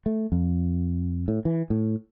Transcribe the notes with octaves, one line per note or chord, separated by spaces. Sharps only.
A3
F2
A2
E3
A2